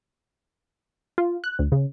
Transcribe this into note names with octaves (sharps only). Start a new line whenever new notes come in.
F4
F#6
D2
C#3